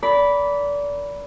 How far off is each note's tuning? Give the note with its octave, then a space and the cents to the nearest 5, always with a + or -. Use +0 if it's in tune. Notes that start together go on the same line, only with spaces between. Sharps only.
A#4 +0 D5 -25 B5 -5